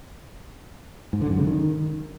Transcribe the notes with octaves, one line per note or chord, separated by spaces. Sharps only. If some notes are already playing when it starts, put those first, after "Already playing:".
G#2
D3
F#2
C#3
D#3